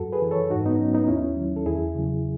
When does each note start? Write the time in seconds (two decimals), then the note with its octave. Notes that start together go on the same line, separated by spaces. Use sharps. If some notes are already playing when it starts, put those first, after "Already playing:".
Already playing: F#2 F#4 A4
0.13 G#4 B4
0.22 E3
0.31 A4 C#5
0.50 G#2 D#4 F#4
0.66 B3 D#4
0.79 F#3 C#4
0.93 B3 D#4
1.08 D#2 C#4 E4
1.36 D#3 F#3
1.57 A4
1.66 E2 E4 G#4
1.95 C#3 F#3